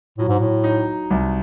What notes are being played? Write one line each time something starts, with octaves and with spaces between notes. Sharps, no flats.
A2 F#3
G#2
A2
D#4
C2